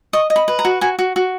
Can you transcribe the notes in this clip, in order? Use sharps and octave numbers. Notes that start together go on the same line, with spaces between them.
D#5 C#6
D#5
B5
B4
A#5
F#4
F#4 G#5
F#4
F#4